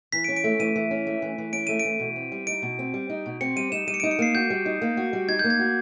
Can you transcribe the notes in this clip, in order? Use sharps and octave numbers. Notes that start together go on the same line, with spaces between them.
E3 B6
D7
C#4
D7
A3
E3 D#7
E3
C#4
A3
E3
E3
C#4 D7
A3 D#7
D7
E3
B2
C4
G3
D#4 D7
B2
C4
G3
D#4
B2
C4 C#7
G3 D#7
D#4 E7
G3 D#7
C#7
D#4 D7
C#7
A#3 C7
F#4 G6
G3
D#4
A#3
F#4
G3
D#4 G#6
A#3 G6
G#6
F#4